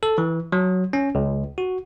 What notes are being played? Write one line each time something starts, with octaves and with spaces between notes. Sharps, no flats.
A4
E3
F#3
C#4
C#2
F#4